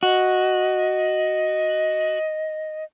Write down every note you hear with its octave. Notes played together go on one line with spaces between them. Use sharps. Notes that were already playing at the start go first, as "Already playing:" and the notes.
F#4 D#5